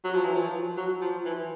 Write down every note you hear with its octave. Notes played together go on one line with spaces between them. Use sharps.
F#3
F3
E3
F3
F#3
F3
E3